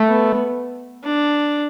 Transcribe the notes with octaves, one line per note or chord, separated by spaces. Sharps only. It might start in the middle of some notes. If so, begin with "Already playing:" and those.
Already playing: A3
B3
D4